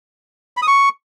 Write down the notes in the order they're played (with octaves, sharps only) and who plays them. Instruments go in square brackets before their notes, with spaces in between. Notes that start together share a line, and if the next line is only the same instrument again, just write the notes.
[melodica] B5
D#6
C#6